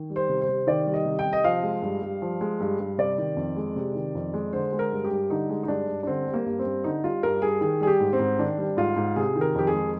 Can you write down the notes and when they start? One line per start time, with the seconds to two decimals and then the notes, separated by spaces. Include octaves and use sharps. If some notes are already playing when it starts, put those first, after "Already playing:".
Already playing: D#3
0.10 G3
0.16 C5
0.29 C3
0.42 C5
0.48 C3
0.67 D#3 D5
0.86 G3
0.93 D#5
1.05 C3
1.19 G5
1.25 C3
1.33 D#5
1.44 F3 F5
1.63 G#3
1.82 G2
2.02 G2
2.22 F3
2.41 G#3
2.61 G2
2.80 G2
2.98 C3 D5
3.18 D#3
3.37 F2
3.56 G#3
3.76 C3
3.95 D#3
4.15 F2
4.34 G#3
4.53 D3 C5
4.73 G#3
4.79 A#4
4.92 G2
5.04 G4
5.11 G2
5.30 D3 D#4
5.49 G#3
5.63 D#4
5.68 G2 D4
5.88 G2
6.03 D4
6.07 D3 C4
6.27 G3
6.34 A#3
6.46 G2
6.59 C4
6.65 G2
6.84 D3 D#4
7.04 G3 F4
7.23 G2 A#4
7.42 G2 G#4
7.61 D#3 G#4
7.81 G3 G#4
7.87 G4
8.00 G#2
8.13 C4
8.19 G#2
8.39 D#3 D4
8.58 G3
8.77 G#2 F4
8.96 G#2
9.16 C3 G#4
9.36 D#3
9.41 A#4
9.55 F2 G4
9.67 G#4
9.73 G#3